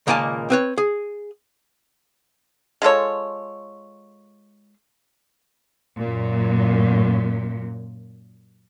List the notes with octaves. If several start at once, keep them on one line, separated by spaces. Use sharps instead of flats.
C#2 A#2 D#3 A#3 G#5 A5
C4 B4 C#5
G#4
G#3 F4 A4 C#5
F#2 A#2